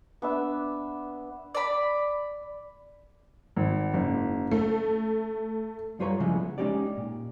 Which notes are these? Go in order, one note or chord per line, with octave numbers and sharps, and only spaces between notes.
B3 D4 E5
D5 B5
G#1
F#1
A3
F#2 G3 F4 B4 C#5 A#5
C#3 E3 F3 G#3
B3
G#3 A3 C#4 D#4 G4 D5
A#2